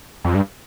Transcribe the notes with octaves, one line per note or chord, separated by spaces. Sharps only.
F2
G2